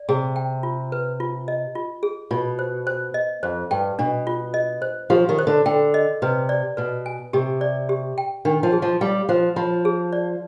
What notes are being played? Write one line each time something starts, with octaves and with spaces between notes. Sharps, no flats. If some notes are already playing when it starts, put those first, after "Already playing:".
Already playing: D5
C3 G#4
G5
F4
B4
F4
D#5
F4
G#4
B2 F4
C5
C5
D#5
F2 C5
G2 G5
B2 D4
F4
D#5
C5
F3 G4
D#3
C5
D3
D3 G5
D#5
C3 B4
D5
B2 B4
G#5
C3 G4
D5
G4
G5
D#3 D4
F3
G#4
F3
G3 F5
F3 C5
F3 F4
G#4
D5